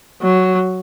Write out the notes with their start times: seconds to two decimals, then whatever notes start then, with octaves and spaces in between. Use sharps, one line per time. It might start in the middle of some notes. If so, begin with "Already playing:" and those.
0.22 F#3